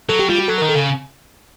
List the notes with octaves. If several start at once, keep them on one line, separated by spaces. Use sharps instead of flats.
F#3 A4
G4
G3 F4
F#4
F#3 A4
D#3 A#4
A4
C#3